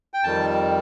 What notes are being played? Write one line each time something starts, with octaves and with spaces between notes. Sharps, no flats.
G5
F2 D#3 G3 A5